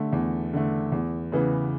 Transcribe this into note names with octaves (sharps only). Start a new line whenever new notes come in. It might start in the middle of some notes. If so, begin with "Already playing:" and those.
Already playing: D3 A3
E2
D3 A3
E2
C#3 E3 B3